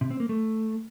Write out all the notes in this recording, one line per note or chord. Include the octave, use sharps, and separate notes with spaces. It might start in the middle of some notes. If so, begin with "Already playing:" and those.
C3
C4
A#3
A3